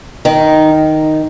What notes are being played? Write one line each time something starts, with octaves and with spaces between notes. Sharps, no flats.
D#3 D#4